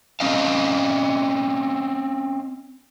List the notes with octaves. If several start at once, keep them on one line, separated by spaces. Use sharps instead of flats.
C4 C#4 D#5 F5